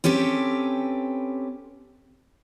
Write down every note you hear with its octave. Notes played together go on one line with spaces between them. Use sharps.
C4 C#4 G4 A4 B4